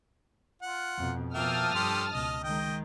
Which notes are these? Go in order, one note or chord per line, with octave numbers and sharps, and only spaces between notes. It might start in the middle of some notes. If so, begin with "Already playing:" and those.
F4 F#5
F2 B2
B2 F3 A#3 E5 G5 A5 D#6 F6
G2 G4 A4 C6
C#2 B2 D#5
D#3 G#3 D#5 G5